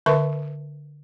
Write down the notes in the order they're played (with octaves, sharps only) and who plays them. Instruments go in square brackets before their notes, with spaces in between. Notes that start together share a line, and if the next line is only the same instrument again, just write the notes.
[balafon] D3 A#4 B4 E5 A5 C#6